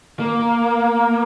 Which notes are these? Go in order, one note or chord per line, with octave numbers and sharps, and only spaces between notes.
A#3